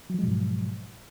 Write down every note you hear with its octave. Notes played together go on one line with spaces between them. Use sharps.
G#2 B2 F3 F#3 G#3